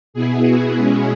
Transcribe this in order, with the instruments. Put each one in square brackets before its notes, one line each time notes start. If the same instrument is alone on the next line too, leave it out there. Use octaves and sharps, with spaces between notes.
[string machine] B2 B3 E4 G#4
F#4
B2 G#3 C#4 E4 G#4